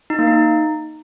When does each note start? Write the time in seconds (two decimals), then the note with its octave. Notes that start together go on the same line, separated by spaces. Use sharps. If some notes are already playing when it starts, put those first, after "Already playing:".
0.10 D#4
0.19 A#3
0.27 D#4